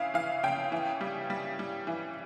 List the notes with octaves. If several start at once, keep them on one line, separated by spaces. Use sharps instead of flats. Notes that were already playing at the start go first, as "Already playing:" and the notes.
Already playing: C#3 E3 E4 F5
E3 F5
C#3 G5
E3
G3
G3
G3
E3